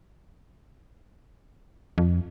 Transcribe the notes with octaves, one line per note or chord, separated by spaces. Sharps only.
F2